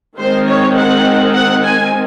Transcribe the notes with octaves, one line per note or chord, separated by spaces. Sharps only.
D#3 G#3 C4 C5
C#5
F#5
F#5
G#5